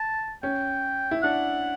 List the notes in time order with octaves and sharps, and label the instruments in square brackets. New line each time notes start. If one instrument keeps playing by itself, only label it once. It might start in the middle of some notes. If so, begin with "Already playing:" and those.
Already playing: [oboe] A5
[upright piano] C#4 [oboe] G5
[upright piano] E4
[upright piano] D4 [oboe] F#5